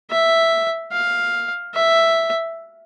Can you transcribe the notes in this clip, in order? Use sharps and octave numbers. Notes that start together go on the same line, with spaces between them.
E5
F5
E5